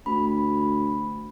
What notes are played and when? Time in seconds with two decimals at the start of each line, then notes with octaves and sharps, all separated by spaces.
0.06 D2 B5